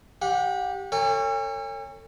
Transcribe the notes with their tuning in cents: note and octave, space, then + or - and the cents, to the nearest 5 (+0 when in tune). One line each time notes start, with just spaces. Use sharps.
G4 +0 F#5 -35
A4 +45 C#5 +0 G#5 -45